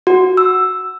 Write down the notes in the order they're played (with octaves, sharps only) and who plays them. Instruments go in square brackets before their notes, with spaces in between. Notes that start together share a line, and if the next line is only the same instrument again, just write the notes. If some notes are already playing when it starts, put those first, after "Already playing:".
[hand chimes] F#4
E6